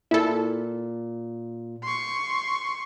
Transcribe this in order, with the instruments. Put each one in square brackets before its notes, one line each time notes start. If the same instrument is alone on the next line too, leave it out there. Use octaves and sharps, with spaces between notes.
[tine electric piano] A#2 [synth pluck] E4 A4
[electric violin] C6 C#6